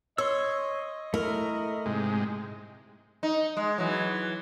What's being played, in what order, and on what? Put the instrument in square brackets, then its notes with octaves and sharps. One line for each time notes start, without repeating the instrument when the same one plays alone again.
[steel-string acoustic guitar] C#5 [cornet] D#5 [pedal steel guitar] C6 E6
[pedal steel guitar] A3 E4 [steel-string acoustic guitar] A#4
[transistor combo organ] G#2 C3 G#3
[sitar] D#4
G#3
E3 F#3